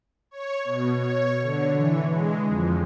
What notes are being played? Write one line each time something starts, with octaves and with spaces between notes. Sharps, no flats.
C#5
B2
C#5
D3
E3
G#3
F2